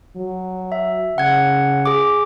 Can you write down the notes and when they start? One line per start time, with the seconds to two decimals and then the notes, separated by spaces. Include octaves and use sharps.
0.16 F#3
0.72 E5
1.18 C#3 F#5 G#6
1.86 G#4 D6